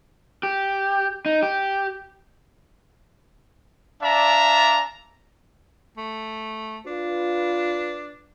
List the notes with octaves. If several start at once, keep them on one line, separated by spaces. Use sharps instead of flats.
G4
D#4
G4
D4 D5 E5 F5 A5 A#5
A3
D4 F4 B4